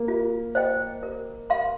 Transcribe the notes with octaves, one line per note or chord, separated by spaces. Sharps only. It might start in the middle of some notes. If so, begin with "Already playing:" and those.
Already playing: A#3
F4
C5 D#5 G5
A#4
F5 C6